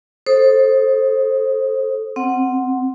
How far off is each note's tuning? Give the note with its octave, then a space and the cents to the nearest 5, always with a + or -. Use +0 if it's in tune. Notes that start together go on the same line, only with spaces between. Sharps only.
A4 +0 C5 +20 D#6 +0
C4 +0 F#5 +0